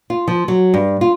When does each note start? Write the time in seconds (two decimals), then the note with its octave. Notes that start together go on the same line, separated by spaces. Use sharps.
0.10 F4
0.28 F3
0.48 F#3
0.74 G2
1.01 F4